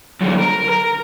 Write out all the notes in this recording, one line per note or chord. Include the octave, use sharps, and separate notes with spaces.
F#2 D3
A#4
A#4